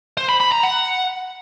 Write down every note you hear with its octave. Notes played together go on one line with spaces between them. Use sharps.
C5
B5
B5
A#5
F#5